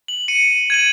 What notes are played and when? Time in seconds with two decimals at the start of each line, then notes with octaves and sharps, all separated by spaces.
0.08 F#7
0.28 C#7 D#7
0.70 G#6 D#7 F#7